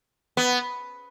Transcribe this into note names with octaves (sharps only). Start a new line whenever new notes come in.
B3